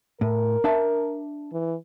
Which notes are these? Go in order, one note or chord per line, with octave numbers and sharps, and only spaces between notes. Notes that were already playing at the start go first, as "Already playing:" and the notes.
A2 A#4
D4 E5 A5
E3